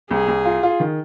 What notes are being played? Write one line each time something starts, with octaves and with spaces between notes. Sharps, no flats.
C2 G#4
C2
F4
F4
D#3